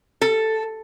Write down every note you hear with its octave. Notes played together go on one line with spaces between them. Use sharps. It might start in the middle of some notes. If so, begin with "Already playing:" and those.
A4